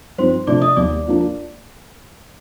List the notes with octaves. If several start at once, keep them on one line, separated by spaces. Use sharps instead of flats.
G2 F3 C4 D#4 C5 C6
C3 F3 A3 D4 D5 D6
D#5 D#6
D#2 D#3 G3 D5 D6
F3 A#3 D4